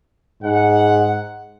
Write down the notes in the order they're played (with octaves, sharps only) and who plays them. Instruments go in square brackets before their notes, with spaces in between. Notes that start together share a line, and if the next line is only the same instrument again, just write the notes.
[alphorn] G#2 [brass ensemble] F#5